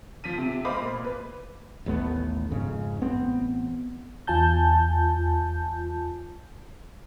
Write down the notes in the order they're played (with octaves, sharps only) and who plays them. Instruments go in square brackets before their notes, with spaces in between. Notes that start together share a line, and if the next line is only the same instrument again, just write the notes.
[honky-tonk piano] F3 B6 D#7
C3
C5 D#5 F5 B5 D6
A#2
B4
[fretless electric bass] A1 D#2 A3 B3
F2 G#2 C#3
A1 B3 C4
[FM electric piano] E2 F4 G#5 A5 G6